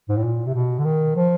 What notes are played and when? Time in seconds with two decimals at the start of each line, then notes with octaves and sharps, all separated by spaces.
0.09 G#2
0.17 A2
0.23 A#2
0.46 C3
0.54 B2
0.79 D3
0.84 D#3
1.15 F3